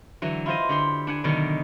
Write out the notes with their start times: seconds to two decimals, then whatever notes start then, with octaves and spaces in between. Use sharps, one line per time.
0.22 D3 E3 F#3
0.46 E4 F4 C5 D#5
0.69 D3 G4 C6
1.07 D4 F#5 G#5
1.24 B2 D3 D#3 F#3